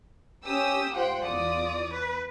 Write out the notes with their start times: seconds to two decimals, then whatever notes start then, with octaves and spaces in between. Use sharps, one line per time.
0.46 C#4 G4 D#6 E6
0.95 F4 C5 F#5 G5
1.25 E2 D5 D#6
1.94 B4